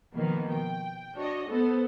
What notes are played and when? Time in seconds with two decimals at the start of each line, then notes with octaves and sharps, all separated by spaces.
0.14 B2 D#3 F3 A#3 B3
0.50 G5
1.15 D4 F#4 C#5 D#5
1.50 B3 A4 C5